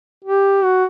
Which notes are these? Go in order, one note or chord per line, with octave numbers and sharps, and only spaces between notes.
G4
F#4